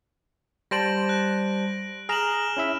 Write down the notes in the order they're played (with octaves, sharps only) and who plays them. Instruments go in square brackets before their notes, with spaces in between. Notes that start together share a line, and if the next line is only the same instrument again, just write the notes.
[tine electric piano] G3 C5 A5 [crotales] A#6 D7 F#7
[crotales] F#6
[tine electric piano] G#4 A#5 [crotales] F6 E7 F#7
[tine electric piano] C#4 E4 E5